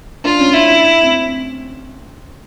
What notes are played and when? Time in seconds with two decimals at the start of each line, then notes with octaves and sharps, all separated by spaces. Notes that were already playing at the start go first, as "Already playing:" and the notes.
0.24 D4 F4
0.39 C#4
0.53 E4
1.02 C4